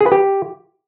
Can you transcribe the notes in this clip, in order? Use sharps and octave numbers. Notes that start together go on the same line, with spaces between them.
G#4
B4
G4